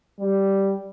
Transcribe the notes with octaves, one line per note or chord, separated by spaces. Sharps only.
G3